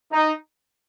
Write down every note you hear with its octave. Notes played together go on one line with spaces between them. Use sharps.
D#4